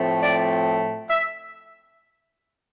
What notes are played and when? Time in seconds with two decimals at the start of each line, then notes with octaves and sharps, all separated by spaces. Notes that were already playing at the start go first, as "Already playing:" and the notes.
Already playing: A2 F3 A3 C4
0.21 D5
1.08 E5